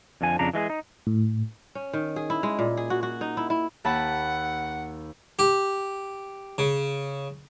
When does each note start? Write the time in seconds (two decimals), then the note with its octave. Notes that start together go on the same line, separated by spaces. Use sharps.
0.21 F2 D3 F3 G#5
0.39 F2 C#3 D4 A#5
0.54 E3 G#3 F4 G#4
0.70 D#4
1.07 A2
1.75 C#4
1.93 D#3
2.16 G#4
2.30 E4
2.43 G#3
2.59 A#2
2.77 G#4
2.90 F#4
3.03 F#4
3.21 D#4
3.37 E4
3.50 E4
3.85 D#2 F#5 A5 B5
5.39 G4
6.58 C#3